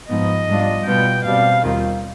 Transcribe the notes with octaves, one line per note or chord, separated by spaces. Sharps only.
G#2 F3 B3 D#4 D#5
G#2 G3 D4 F4
B2 G3 B3 F4 G5
B2 G3 C4 F5
D#2 D#3 G3 C4 F4